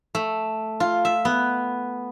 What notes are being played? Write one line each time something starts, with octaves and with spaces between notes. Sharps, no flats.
A3
F4
E5
B3